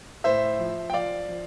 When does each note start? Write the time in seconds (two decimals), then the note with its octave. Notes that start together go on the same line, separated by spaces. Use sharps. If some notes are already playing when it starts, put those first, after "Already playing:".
0.24 A2 C5 E5
0.59 F3
0.90 G5
0.94 F3 D5 F5
1.28 F3